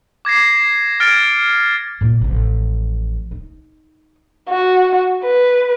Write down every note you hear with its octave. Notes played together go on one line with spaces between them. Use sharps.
D6 G#6 A#6 C7
F6 G#6 A6 C#7 D7
A#2 A#3
A1 F3
D#4
F#4
B4